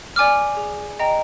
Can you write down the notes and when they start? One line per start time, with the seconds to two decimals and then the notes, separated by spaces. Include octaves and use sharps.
0.16 D5 G#5 D6 F6
0.57 G#4
1.00 D#5 G5 A#5